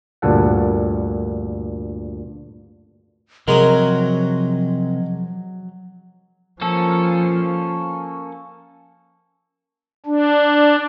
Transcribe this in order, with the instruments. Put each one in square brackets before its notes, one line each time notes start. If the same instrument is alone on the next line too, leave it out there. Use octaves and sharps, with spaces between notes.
[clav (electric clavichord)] D2 G2 A#2 A4 F#5
[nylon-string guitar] C3 A#4 [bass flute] F3 [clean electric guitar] F#3 [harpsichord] G#3 C6 D#6
[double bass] F3 [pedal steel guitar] A#3 C#4 A4
[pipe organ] D4